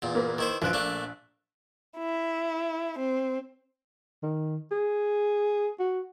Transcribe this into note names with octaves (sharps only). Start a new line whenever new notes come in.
E2 A#2
A#3 B4
D#3 E4 C5
A#1 E3 F3 F#6 D7
A3 A#3 D4
E4
C4
D#3
G#4
F#4